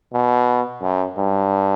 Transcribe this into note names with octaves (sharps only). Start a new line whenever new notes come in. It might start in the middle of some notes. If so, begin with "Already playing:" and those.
B2
F#2
G2